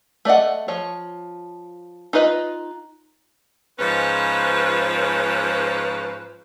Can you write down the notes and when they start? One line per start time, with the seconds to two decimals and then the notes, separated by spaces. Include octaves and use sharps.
0.25 A3 D5 D#5 F#5
0.68 F3 C#5
2.13 D#4 F4 B4 D#5
3.78 G#2 F3 C#4 B4